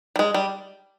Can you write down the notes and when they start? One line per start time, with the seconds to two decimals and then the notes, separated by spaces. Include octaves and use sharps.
0.16 G3
0.19 G#3
0.34 G3